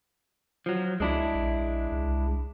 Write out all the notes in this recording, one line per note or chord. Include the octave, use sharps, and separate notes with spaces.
F3 F#3
C#2 G#3 D4 E4
A#1
C2